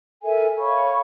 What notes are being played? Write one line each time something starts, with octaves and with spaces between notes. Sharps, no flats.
A4 A#4 E5 G#5
C#5 F5 B5 C#6